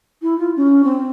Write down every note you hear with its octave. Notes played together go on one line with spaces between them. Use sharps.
E4
F4
C#4
C4